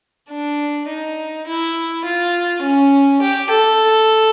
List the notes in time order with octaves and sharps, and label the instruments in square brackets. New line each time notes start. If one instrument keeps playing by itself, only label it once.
[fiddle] D4
D#4
E4
F4
C#4
G4
A4